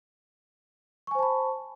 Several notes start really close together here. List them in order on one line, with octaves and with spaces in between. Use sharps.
C#6 G#5 C5 A5 B5